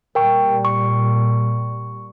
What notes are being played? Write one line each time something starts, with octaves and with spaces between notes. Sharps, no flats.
A#2 G3 A#4 G5 C#6
C#6